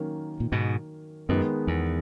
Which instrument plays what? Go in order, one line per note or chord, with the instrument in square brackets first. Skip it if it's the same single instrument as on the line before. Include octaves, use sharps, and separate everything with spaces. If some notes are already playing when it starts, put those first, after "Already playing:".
Already playing: [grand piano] D#3 F#3 A#3 C#4
[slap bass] A#2
G#2 B2
[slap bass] F#2 [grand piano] D#3 G#3 B3
[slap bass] E2